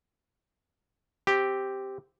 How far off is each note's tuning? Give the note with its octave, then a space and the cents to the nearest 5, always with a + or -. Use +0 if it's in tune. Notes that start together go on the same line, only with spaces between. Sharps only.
C4 +0 G4 +0